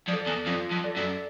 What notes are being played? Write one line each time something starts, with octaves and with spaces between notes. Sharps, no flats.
F2 A4 D5
E2
F2 F4
F2
A4 D5
F#2